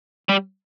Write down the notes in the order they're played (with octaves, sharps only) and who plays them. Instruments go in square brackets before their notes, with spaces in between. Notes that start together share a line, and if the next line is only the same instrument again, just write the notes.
[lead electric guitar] G3